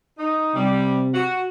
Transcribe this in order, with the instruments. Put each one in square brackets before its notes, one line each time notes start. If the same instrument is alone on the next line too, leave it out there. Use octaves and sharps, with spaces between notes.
[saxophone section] D#4
[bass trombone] C3 [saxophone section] G3
[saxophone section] F#4